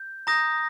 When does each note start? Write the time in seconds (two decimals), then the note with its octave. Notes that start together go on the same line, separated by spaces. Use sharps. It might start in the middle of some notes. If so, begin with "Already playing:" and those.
Already playing: G6
0.27 A#5 D#6 G6 A#6